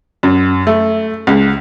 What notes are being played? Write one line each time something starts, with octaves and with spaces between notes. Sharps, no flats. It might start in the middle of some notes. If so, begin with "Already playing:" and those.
F#2
A3
C#2